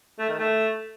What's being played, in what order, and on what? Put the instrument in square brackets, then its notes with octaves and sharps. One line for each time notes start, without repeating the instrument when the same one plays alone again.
[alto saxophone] A3
D#3
A3